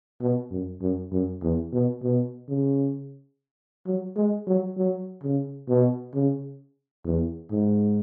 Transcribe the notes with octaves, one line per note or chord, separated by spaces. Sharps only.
B2
F#2
F#2
F#2
E2
B2
B2
C#3
F#3
G#3
F#3
F#3
C#3
B2
C#3
E2
G#2